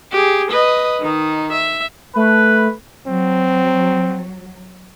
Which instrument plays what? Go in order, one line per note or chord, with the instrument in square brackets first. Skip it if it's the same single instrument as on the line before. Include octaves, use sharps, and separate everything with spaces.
[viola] G4 G#4
B4 D#5
D#3 D#4
E5
[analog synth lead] A3 [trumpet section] B4
[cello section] F#3 [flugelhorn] C4